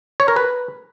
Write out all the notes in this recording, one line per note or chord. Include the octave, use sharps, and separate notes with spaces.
C#5
A#4
B4